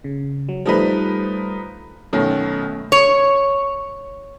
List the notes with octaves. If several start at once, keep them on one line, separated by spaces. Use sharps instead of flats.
C#3
F#3
F3 G3 A3 D#4 B4 B5
F#2 B2 D#3 A3 C#4
C#5